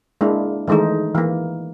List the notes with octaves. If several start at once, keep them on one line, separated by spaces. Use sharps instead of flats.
G#3 A#3 D4 E4
D#3 E3 G#3 A3 D#4
E3 A#3